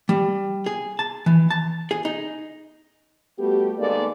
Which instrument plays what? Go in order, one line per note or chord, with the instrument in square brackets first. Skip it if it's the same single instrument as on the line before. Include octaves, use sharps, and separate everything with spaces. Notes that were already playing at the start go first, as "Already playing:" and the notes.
[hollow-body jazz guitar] G3
G#4
A5
E3
A5
G#4
D#4
[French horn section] G3 A3 B3 F#4 G4
D#3 G#3 A#3 B3 A4 D5